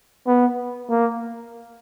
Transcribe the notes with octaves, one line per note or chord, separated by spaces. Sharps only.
B3
A#3